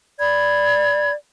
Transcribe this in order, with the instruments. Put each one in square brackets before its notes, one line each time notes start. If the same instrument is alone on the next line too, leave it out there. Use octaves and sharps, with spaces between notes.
[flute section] D5 B5 G#6